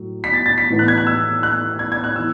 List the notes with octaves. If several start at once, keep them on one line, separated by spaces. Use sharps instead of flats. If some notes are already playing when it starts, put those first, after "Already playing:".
Already playing: A2 F#3
B6
A6
A6
B6
A2 E3 B3
F#6
G#6
F#6
E6
F#6
G#6
G#6
F#6
E3 E6